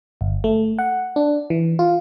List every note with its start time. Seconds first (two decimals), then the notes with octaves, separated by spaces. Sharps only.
0.21 G1
0.44 A3
0.79 F#5
1.16 D4
1.50 E3
1.79 F4